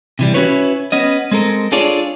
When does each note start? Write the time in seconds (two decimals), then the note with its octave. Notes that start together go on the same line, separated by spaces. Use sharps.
0.19 C3 E3 G3
0.34 C#4 E4 F#4 B4 C#5
0.92 B3 C#4 D#5
1.31 G#3 C4 A4 A#4
1.72 D4 F4 G#4 A4 C#5 D5